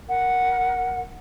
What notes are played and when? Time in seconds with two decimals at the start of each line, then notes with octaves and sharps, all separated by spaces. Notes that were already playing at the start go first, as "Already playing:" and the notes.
0.09 A#4 F#5